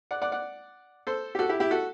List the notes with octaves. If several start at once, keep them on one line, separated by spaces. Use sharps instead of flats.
D5 F#5
D5 F#5
D5 F#5
A4 C5
G4
F#4 A4
E4 G4
E4 G4
F#4 A4